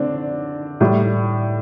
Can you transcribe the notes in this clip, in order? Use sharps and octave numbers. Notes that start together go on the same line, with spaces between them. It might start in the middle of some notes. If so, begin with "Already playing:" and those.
Already playing: D3 C4 D4
A2 G3